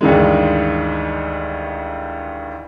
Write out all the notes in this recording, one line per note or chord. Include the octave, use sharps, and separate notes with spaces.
D2 G2 D#3 E3 G#3